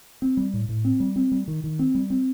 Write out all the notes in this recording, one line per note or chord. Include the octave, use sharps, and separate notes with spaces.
C4
G3
A2
A2
C4
G3
C4
G3
D#3
D#3
C4
G3
C4